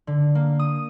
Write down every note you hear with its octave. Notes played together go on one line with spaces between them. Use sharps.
D3
A#3
D#6